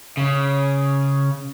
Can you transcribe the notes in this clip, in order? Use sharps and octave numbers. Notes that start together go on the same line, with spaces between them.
C#3